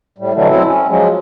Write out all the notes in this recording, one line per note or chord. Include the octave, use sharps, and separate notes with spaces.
A2 G3
B2 D3 E3 F#3 G3 A3
F#3 C4 E4 A4
C#4
F3 F#3 G#3